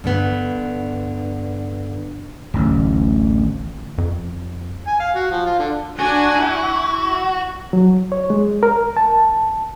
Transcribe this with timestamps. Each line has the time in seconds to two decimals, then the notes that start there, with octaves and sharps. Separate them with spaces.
0.04 G2 D3 B3
2.54 D1 A1
3.98 F2
4.87 G#5
5.00 F5
5.16 F#4
5.31 F3
5.46 F4
5.59 D3
5.99 D4 F#4 G#5
6.38 E4
7.73 F#3
8.12 C#5
8.30 G#3
8.63 A#4
8.97 A5